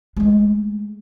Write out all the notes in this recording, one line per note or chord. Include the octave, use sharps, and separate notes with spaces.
G#3 A3